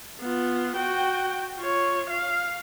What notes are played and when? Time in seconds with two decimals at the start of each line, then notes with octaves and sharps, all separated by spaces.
0.21 B3 F4
0.77 F#4 G5
1.58 F4 C#5
2.10 F5